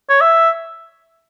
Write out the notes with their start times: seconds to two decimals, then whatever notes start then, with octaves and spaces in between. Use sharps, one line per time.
0.09 C#5
0.21 E5